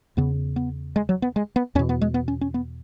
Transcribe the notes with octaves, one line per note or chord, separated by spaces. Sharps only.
E2 C#3 B3
B3
G#3
F#3
B3
G#3
B3
E2 B2 C#4
B3
G#3
B3
C#4
C#4
B3